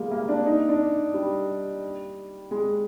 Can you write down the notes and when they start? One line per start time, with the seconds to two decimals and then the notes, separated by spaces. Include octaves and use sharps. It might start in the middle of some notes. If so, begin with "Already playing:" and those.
Already playing: G3 G#3 A#3
0.11 A#3
0.29 D4
0.46 D#4
0.68 D4
1.14 G3
2.51 G#3